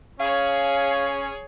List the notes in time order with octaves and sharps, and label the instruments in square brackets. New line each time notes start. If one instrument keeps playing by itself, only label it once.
[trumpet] C#4 [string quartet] G#4 C#5 [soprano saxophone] F5